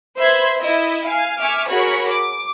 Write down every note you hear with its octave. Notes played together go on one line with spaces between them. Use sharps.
B4 C5 E5 B5 C6 G#6
E4 D#5 E5
F5 G#5
E5 G#5 C#6 D6 F6
F#4 G#4 A#4 C#5 B5 C#6
D6